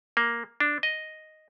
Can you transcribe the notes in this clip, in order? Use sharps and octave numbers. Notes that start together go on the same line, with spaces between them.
A#3
D4
D#5